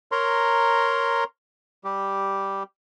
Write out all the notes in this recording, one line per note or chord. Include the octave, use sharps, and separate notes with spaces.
A#4 C#5 A#5 C6
G3 G4